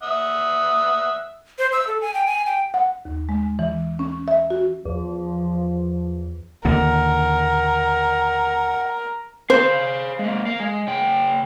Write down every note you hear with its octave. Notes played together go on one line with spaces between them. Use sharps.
E5 F#5 D#6
C5
E6
A4
G#5
G5
G#5
G5
F#5
D#2
G#3
E3
C#4
E5
F#4
E2 F3
D#2 A#2 D3 A#4 F#5
G#4 C5 F5
G#3 A#3
A#4 F5
G#3
C#3 G5